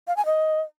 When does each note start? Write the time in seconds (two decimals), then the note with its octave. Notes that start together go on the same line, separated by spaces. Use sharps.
0.08 F5
0.17 G#5
0.26 D#5